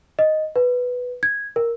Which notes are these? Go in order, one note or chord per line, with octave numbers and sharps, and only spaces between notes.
D#5
B4
G#6
A#4